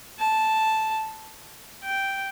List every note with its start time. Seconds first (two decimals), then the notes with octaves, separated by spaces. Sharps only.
0.19 A5
1.84 G5